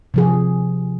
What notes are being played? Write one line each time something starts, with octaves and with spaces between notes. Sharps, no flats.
C3 F3 G#4